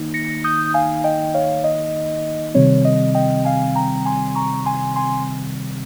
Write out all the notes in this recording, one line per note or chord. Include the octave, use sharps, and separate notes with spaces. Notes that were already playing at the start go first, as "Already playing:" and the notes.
Already playing: D#3 A#3 D#4
A#6 C#7
D#6 G6
F5 G#5
D#5 G5
C#5 F5
D#5
C3 D#3 G3 C4 C#5
D#5
D#5 G5
F5 G#5
G5 A#5
G#5 C6
A#5 C#6
G#5 C6
G#5 C6